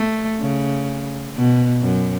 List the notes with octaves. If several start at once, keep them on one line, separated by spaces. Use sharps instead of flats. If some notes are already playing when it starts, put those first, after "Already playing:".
Already playing: A3
C#3
B2
F#2